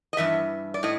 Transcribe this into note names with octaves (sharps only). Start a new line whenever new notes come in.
D#5
G2 E3 E5
D5
A2 D#5